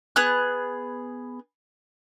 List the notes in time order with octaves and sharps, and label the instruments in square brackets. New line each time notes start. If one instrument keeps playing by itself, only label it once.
[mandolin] B3 G#4 F#6